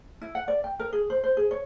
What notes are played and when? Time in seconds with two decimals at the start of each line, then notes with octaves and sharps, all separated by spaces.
0.22 E4
0.35 F#5
0.48 D5
0.64 G5
0.79 A#4
0.93 G#4
1.10 C5
1.24 C5
1.37 G#4
1.51 C#5